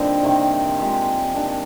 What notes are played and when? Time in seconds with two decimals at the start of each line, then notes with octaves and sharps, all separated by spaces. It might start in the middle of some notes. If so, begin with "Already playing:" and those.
Already playing: A#2 D3 G3 C4 D#4
0.23 C3 D#3 A#3
0.80 C3 F3 G#3
1.35 C3 D#3 A#3 D4